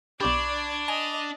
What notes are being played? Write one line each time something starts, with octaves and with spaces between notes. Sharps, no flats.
B1 D4 G4 D5 B5 C#6 D6 G#6
D#5 G#5 F7